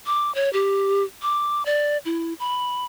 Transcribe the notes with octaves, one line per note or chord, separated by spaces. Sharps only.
D6
C#5
G4
D6
D5
E4
B5